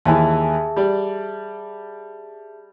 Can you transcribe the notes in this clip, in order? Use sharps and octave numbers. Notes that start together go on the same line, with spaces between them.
D#2 E3 G#4 E5 A5
G3 D5